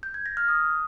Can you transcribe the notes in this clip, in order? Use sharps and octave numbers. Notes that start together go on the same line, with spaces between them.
G6
G#6
A#6
F6
D#6